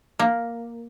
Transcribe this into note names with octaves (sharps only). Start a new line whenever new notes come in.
A#3